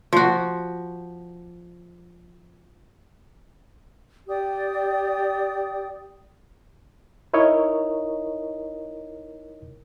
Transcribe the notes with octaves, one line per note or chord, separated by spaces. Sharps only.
F3 F#4
G4 D5 G5 D#6
D#4 E4 A#4 C#5 D#5